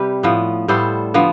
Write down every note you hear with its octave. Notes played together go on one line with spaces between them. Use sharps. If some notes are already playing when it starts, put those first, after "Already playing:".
Already playing: C3 G3 G4 B4
A2 F3 B3
A2 G3 B3 A4 C5
D3 F3 B3